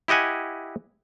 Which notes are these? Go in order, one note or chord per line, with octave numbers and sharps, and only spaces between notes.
E4 G4 D#5 F#5 G#5